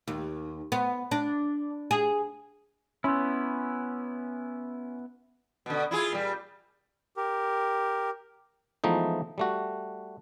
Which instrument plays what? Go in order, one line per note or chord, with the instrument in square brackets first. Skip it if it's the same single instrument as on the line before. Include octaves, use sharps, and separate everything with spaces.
[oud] D#2
B3
D4
G#4
[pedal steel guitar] B3 E4 [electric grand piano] C#4 [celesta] B5 C6 E6
[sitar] B2 D3
E4 F4 G#4
A#2 G3
[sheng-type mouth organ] G4 A#4
[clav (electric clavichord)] E3 F3 G#3 A3 B3 D#4
G3 A3 F#4